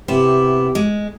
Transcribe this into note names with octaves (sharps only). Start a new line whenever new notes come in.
C3 B3 E4 G4
G#3